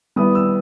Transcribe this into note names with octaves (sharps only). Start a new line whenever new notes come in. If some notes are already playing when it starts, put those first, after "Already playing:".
G3 B3 E4 D#6
E6